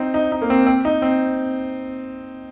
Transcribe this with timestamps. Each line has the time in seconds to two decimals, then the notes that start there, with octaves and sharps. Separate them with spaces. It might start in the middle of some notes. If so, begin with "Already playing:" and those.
Already playing: C4 D#4
0.14 D#4
0.32 D#4
0.42 A#3
0.50 C4
0.67 C4
0.85 D#4
1.02 C4